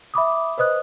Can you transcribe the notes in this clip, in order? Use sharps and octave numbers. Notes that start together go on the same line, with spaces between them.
E5 B5 D6 D#6
B4 C5 D#5 D#6 F#6